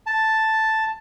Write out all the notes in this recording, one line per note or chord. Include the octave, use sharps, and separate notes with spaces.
A5